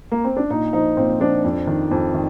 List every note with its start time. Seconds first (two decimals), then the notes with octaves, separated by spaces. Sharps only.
0.11 A#3
0.24 C4
0.37 D4
0.50 A#2 D#4
0.73 F3 D#4
0.97 A#2 C4
1.20 F3 D4
1.44 F2
1.67 D#3
1.91 F2
2.14 D#3